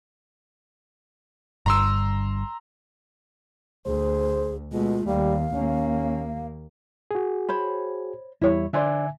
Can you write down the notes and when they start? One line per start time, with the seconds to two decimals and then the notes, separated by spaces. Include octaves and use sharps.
1.66 G1 G2 A#5 C6 E6
3.86 D2 G#4 C5
4.73 B2 G#3 A3 F4
5.07 D#2 G3 F5
5.55 D#2 A#3 C#4
7.11 F#4 G#4
7.49 C5 C#5 B5
8.42 E2 G3 E4 C#5
8.73 D3 D4 C5 D5 E5 G#5